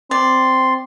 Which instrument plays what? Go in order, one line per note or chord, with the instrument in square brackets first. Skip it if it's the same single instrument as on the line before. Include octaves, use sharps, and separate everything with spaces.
[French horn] C4 [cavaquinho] D5 [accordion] C6